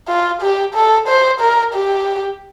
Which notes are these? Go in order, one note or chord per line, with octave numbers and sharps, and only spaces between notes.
F4
G4
A4
C5
A#4
G4